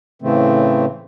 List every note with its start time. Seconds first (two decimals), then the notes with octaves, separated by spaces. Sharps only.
0.22 A2 C#3 E3 A3 C4